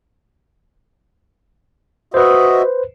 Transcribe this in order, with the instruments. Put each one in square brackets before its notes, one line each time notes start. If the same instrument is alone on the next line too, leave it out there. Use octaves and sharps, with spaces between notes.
[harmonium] F#4 D#5 E5 [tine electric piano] B4 C5